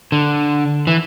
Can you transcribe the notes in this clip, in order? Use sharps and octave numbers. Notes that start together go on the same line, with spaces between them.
D3
E3